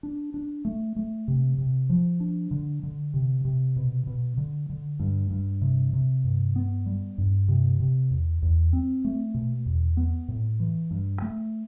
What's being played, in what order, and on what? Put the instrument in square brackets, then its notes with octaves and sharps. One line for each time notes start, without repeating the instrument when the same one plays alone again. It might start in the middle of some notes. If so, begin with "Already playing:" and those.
[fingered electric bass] D4
D4
A3
A3
C3
C3
F3
D4
D3
D3
C3
C3
B2
B2
D3
D3
G2
G2
C3
C3
G2
B3
G3
G2
C3
C3
E2
E2
C4
A3
B2
E2
B3
A2
E3
G2
A3